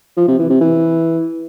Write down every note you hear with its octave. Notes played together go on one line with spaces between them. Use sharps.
F3
C3
E3
C3
E3